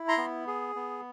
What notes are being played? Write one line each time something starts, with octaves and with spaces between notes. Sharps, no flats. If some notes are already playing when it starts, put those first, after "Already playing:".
Already playing: E4
A#5 C6
B3
G#4
B3